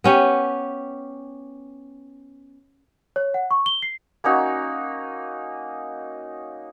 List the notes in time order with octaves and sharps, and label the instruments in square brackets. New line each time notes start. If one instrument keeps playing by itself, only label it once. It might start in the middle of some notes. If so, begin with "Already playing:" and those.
[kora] B3 C#4 G4
[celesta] C#5
F#5
C#6
G7
C7
[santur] A#3 C#4 D#4 F#4